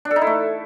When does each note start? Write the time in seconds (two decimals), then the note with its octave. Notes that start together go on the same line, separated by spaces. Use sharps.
0.05 D4
0.11 A4
0.16 D#4
0.21 E4
0.27 A3